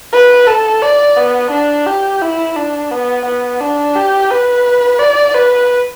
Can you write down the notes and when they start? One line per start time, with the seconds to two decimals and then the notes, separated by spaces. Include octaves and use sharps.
0.13 B4
0.47 A4
0.82 D5
1.17 B3
1.51 D4
1.86 G4
2.22 E4
2.56 D4
2.91 B3
3.26 B3
3.61 D4
3.96 G4
4.31 B4
4.99 D5
5.34 B4